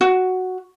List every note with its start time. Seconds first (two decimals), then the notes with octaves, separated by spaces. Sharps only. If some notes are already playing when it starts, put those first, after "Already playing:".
0.01 F#4